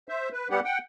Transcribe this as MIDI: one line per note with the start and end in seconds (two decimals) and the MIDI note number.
0.09 0.29 72
0.09 0.29 76
0.33 0.48 71
0.50 0.60 55
0.50 0.60 59
0.50 0.60 67
0.50 0.60 78
0.65 0.78 78
0.65 0.78 79